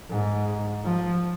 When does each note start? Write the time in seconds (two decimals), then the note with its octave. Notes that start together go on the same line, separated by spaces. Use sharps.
0.10 G#2
0.84 F3